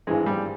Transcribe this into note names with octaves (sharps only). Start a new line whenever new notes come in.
G#1 G2 E3 G#3
G3